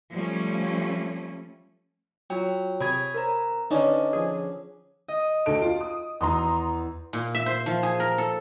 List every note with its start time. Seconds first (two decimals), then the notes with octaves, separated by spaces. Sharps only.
0.11 F3 G3 A3 C#4
2.30 F#3 F4 G5
2.81 C3 G#4 C#5 B5 G#6
3.14 A#4 C5 A#5
3.71 D3 C#4 D#4 B4 D5 D#5
4.13 F3 G#4
5.08 D#5
5.46 D2 A4 D7
5.62 F4
5.81 D#6
6.21 E2 A#5 C6 D#6
7.13 A#2
7.35 E5
7.46 C5
7.66 F3
7.83 G#4
8.00 A#4
8.18 A4